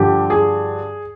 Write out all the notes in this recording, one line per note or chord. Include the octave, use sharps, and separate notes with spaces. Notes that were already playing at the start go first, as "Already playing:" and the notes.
Already playing: G2 D3 F3 G4
G#4